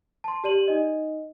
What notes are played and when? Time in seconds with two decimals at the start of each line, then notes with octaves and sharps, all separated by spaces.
0.24 A5 C6
0.44 G4 D5 D#7 F#7
0.68 D#4 D#5